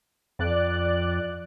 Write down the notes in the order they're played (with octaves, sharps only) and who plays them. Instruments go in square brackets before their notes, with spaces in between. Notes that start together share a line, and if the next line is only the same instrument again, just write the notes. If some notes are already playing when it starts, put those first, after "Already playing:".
[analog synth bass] F2 [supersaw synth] D5 F#6